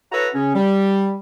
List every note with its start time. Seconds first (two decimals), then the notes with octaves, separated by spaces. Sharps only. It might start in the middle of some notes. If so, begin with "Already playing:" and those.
0.12 E4 F#4 A4 B4 C#5 A#5
0.35 C#3 C#4
0.55 G3